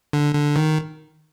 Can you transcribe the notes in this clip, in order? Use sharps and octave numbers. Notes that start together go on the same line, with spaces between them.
D3
D3
D#3